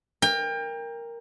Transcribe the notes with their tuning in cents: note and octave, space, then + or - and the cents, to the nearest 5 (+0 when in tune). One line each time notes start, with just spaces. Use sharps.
A#4 +0 G5 +30